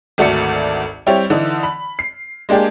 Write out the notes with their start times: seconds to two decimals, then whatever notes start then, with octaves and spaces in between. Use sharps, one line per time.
0.18 G#1 D2 A3 F#4 D5 C#7
1.06 G3 C4 E4 G4 C#5
1.30 D3 E3 D#4
1.63 B5
1.99 C7
2.49 G#3 A#3 D4 G4 G#4